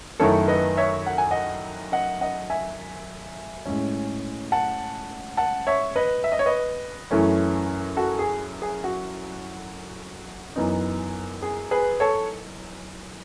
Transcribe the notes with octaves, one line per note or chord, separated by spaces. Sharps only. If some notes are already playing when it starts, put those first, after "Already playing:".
F#2 D#3 A3 E4 A4 C#5
B4 D#5
C#5 E5
F#5
G#5
D#5 F#5
D#5 F#5
D#5 F#5
E5 G#5
A2 G#3 C#4
F#5 A5
F#5 A5
C#5 E5
B4 D#5
E5
D#5
C#5
B4 D#5
F#2 E3 A3 C#4 E4
F#4 A4
G#4
G#4
F#4
F#2 E3 B3 D#4
G#4
G#4 B4
A4 C#5